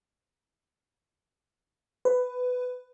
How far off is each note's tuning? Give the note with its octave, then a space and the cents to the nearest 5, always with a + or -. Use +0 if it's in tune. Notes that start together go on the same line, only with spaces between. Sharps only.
B4 +15